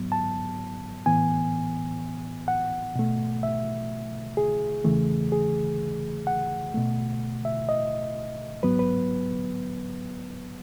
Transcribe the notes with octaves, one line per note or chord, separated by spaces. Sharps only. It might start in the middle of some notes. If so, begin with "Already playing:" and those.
Already playing: G#2 F#3 B3
A5
A2 E3 B3 G#5
F#5
B2 A3
E5
G#4
E2 C#3 E3 A3
G#4
F#5
B2 A3
E5
D#5
G#2 F#3 B3 B4
B4